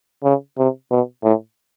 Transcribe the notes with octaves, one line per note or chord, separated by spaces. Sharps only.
C#3
C3
B2
A2